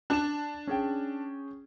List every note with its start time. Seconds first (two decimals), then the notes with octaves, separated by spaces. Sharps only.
0.10 D4 F#6 E7
0.67 C#4 G#4 G5